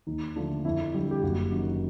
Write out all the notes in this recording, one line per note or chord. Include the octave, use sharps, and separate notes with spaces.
D#2 D#4
D3 F3 A3 D4
F2 E4
D3 G3 F4
G4
F#1 F#4
F#2 D#3